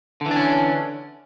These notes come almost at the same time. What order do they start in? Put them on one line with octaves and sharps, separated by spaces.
D3 E3 D4 C#4